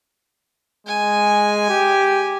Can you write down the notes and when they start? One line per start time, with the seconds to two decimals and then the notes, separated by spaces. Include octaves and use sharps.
0.87 G#3 G#5
1.70 G4